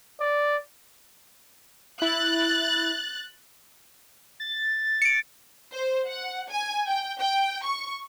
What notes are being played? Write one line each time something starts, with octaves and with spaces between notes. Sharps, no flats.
D5
E4 F#6 A6
A6
C#7 D7
C5
F#5
G#5
G5
G5
C#6